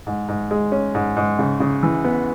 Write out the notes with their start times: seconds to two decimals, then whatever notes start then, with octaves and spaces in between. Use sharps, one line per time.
0.07 G#2
0.28 G#2
0.51 G#3
0.72 C#4
0.95 G#2
1.17 G#2
1.39 C#3
1.60 C#3
1.83 E3
2.04 B3